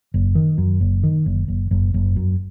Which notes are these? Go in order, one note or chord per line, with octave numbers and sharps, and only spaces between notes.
F#1
D#3
F#2
F#1
D#3
F#1
F#1
F#1
F#1
F#2